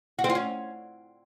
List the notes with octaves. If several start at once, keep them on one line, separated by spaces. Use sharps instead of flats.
F#4
C4
F4
C#4